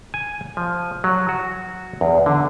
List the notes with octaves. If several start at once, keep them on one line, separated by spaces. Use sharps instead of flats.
G#5
F3
F#3
F#4
E2
D3